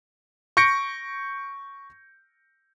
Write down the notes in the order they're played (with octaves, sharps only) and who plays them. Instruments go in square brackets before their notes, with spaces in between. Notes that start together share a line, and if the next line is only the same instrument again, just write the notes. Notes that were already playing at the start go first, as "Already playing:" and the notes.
[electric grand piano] C#6 G6 A#6 C#7 D7